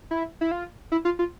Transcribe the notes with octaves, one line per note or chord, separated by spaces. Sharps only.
E4
E4
F4
E4
F4
F4